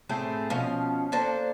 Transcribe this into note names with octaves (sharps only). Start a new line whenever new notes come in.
A2 A3 C4 G#4
B2 F3 C#4 F5
A#3 D4 A4 C5